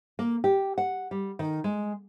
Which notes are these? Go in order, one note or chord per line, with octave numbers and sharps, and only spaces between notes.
A#3
G4
F#5
G3
D#3
G#3